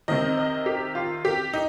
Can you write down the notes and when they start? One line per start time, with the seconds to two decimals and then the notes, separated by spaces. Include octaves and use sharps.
0.08 C3 D#3 D#5
0.37 D#5
0.66 G4
0.95 F4
1.25 G4
1.53 D#4